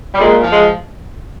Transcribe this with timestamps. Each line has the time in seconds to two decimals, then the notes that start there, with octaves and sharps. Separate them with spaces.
0.14 G3
0.19 A#2 G#3
0.42 F3
0.52 G#3